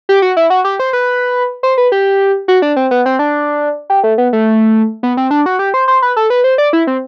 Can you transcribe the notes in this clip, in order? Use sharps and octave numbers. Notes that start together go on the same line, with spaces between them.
G4
F#4
E4
F#4
G4
C5
B4
C5
B4
G4
F#4
D4
C4
B3
C4
D4
G4
A3
B3
A3
B3
C4
D4
F#4
G4
C5
C5
B4
A4
B4
C5
D5
E4
C4